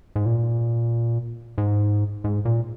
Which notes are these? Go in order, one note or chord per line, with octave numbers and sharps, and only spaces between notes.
G#2
A#2
G#2
G#2
A#2